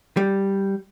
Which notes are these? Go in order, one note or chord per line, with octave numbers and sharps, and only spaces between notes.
G3